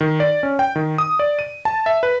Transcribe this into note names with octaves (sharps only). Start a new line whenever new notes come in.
D#3
D5
C#4
G5
D#3
D#6
D5
D#7
A5
E5
B4